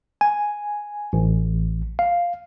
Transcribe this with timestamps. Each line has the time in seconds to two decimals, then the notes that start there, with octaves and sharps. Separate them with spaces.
0.21 G#5
1.13 A1
1.99 F5